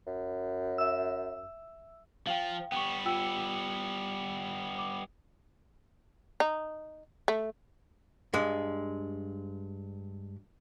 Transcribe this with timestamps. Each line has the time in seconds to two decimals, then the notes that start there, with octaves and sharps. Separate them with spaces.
0.06 F#2
0.78 E5 E6
2.27 F3 F5 G5
2.72 G3 B3 G5 C#6
3.06 F4 G5 E6
4.79 D6
6.40 D#4
7.28 A3
8.33 G2 G#3